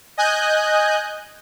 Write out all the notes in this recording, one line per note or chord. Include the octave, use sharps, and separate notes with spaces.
D#5 G#5 F#6 G6